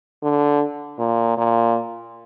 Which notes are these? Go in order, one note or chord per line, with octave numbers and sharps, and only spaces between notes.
D3
A#2
A#2